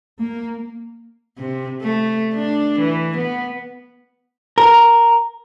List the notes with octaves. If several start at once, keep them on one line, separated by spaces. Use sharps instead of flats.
A#3
C3
A3
D4
E3
B3
A#4